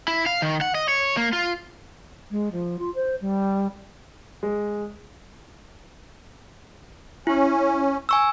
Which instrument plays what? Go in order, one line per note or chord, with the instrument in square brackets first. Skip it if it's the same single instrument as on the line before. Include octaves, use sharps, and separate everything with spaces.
[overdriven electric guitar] E4
F5
D#3
F#5
D#5
C#5
A#3
F4
[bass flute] G#3
F3
F4
C5
G3
[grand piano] G#3
[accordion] C#4 [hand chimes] E4
[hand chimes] G#5 C#6 E6